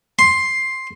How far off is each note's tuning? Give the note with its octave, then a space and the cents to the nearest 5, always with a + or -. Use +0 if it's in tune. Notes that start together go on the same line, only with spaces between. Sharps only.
C6 +10